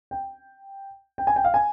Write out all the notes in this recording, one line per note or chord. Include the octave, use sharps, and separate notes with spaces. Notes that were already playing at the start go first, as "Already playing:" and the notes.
G5
G5
G#5
G5
F5
G#5